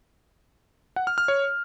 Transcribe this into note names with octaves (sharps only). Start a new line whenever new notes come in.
F#5
F6
F6
C#5